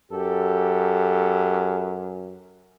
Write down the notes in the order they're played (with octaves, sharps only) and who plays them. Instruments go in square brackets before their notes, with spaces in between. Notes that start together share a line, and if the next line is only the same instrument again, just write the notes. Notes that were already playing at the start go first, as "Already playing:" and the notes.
[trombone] F#2 [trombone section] G4 A4